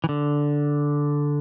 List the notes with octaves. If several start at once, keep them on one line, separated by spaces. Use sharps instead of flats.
E3
D3